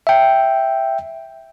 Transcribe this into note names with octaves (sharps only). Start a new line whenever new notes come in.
E5 G5